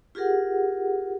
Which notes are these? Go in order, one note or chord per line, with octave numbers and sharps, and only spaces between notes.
F4 G4 G#4 A#4 F#5